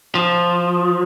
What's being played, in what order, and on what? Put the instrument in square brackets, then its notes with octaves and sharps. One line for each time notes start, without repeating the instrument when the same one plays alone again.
[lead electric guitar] F3